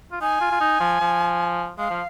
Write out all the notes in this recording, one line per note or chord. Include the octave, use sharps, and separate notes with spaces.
F4
D#4 G#5
F4
F4
D#4
F3
F3
G#3 F5
F3